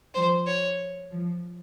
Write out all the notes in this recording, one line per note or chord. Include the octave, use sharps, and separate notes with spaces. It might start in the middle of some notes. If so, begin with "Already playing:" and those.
F3 C5
C#5
F3